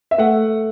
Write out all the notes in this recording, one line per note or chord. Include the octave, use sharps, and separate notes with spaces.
E5
A3 F#5